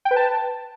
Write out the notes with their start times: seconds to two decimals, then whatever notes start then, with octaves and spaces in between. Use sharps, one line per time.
0.05 G5
0.11 B4
0.16 A5